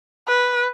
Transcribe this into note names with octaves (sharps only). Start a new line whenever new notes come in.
B4